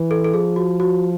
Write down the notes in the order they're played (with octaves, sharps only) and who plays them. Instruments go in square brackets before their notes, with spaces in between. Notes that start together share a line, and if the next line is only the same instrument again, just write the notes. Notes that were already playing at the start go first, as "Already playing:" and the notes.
Already playing: [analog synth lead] E3
[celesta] A4
A4
[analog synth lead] F3 [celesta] G#4
[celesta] F#4
F#4